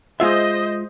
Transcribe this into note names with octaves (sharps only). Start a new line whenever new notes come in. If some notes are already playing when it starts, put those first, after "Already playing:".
G#3 F4 C5 D#5 E5